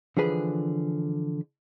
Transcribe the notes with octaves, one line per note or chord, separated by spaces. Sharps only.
D3 E3 F3 G#4 B4 G#5